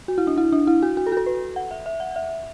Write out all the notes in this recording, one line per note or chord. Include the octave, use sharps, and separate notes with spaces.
F#4
E4
D4
E4
D4
E4
F#4
F#4
A4
F#4
A4
B4
F#5
E5
E5
F#5
E5